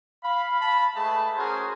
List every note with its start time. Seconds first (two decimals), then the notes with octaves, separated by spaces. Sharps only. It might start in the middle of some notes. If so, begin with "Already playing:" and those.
0.24 F5 B5
0.61 A5 B5
0.96 G#3 A3 G#4 B4 A5
1.36 C#4 F#4 G#4 A#4 C5